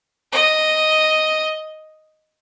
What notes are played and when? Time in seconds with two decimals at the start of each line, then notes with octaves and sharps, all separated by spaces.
0.33 D#5